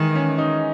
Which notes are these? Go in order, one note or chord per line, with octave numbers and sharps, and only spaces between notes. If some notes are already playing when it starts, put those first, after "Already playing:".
Already playing: D#3 E3 G#3
C#4
D#4